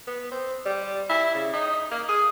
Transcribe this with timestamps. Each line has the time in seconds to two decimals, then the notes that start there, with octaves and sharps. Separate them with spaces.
0.07 B3
0.32 C4
0.66 G3
1.09 E4
1.35 C#3
1.53 D#4
1.91 A#3
2.09 G#4